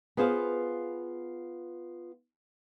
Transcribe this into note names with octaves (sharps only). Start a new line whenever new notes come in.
B3 F4 G#4 C5 E5 F5